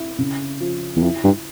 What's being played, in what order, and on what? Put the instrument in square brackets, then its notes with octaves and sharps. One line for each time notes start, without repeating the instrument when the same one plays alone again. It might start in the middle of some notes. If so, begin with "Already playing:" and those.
Already playing: [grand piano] E4
C#3
F3
[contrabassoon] E2
[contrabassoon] F2 [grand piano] E4
[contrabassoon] G2